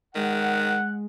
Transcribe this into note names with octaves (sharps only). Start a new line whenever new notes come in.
D#3 G#3 F#5